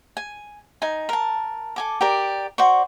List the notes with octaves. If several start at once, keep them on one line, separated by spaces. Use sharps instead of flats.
G#5
D#4 G#5
A#4 A5
A4 G#5 D6
G4 A#4 D5
F#4 C5 D5 C#6